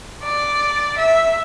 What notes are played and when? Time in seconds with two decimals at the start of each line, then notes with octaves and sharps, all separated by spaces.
0.23 D5
0.98 E5